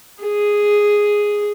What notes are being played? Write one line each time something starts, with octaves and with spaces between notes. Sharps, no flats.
G#4